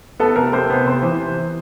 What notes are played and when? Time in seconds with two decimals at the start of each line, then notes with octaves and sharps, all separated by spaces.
0.19 B3 A4
0.36 C3 A#4
0.53 C3 C5
0.70 B3 C5
0.86 C3 C5
1.02 E3